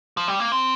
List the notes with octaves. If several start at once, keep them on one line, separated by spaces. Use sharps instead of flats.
F3
G3
A#3
C4